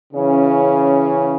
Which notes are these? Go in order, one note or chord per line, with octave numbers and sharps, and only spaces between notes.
C#3 E3 C#4